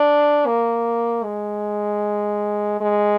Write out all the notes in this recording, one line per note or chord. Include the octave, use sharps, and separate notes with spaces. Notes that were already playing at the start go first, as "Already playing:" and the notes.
Already playing: D4
A#3
G#3
G#3